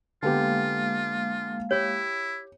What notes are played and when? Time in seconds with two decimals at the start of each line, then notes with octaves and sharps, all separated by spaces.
0.23 D3 G#3 A#3 B3 F4 G4 F5
1.71 E4 G4 C#5